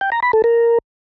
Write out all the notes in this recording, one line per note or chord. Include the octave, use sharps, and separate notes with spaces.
G5
A#5
B5
A4
A#4